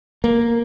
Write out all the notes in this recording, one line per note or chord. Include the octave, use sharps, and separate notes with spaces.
A#3